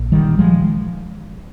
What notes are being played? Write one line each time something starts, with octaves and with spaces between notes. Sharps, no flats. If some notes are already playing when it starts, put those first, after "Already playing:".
Already playing: A#1 A#2
D#3 G3
F3 G#3